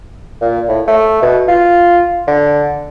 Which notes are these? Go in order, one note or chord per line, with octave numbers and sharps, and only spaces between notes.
A#2
A2
A3
B2
F4
D3